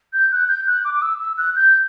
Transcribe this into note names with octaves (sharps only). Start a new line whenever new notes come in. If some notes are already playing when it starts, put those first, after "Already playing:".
G6
F#6
G6
F#6
D6
D6
E6
E6
F#6
G6